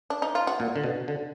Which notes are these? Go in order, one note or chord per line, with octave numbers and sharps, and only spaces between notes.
D4
D#4
F4
F#4
A#2
D3
B2
D3